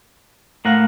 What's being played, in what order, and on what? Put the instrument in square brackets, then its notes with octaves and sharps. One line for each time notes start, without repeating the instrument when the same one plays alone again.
[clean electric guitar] A2 A#4 F#5 [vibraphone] A3 F5